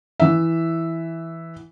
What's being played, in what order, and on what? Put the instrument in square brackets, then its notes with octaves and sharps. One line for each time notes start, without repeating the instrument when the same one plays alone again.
[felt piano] E3 E5